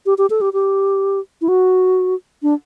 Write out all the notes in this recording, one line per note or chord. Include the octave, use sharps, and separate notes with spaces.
G4
G4
A4
G4
G4
E4
F#4
D4